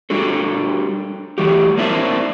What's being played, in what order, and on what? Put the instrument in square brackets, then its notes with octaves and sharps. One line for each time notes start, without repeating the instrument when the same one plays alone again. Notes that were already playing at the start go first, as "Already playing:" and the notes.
[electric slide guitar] G3 D4 F#4 A4
E3 G3 A3 F#4 G4
A#3 C4 D4 E4 E5 A5